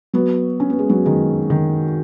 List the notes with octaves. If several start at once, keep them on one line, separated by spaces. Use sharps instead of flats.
F#3 B3
C#4
B3
G#3
F#3 B3
D#3 G#3
D#3